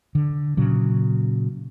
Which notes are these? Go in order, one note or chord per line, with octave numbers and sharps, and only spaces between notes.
D3
A#2 C#3 F#3